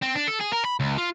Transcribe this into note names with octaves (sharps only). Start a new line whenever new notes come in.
C4
D4
A4
G#4
A#4
B5
C#2
F4